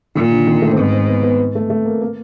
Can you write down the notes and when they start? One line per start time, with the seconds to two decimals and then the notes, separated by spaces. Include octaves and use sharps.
0.15 A#2 D#3
0.31 D3
0.47 D#3
0.62 A3
0.72 C4
0.77 G#2 B3
0.93 C4
1.08 B3
1.23 B3
1.55 A3
1.70 A3
1.85 A#3
2.01 A#3